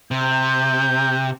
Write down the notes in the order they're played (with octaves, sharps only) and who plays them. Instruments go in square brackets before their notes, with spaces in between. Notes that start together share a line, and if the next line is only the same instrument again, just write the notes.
[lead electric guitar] C3 [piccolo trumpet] G6